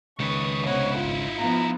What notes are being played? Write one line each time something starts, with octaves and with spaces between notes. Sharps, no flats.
C#2 D#3 B4 C#6 D#6
C3 B3 D#4 E4 C5 C#5 F#5
G#1 F4
F3 B3 F4 A#5